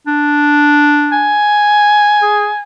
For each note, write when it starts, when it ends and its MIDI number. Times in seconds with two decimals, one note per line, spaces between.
0.07 1.38 62
1.12 2.61 80
2.22 2.48 68